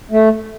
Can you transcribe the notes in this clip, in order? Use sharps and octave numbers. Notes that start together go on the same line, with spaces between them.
A3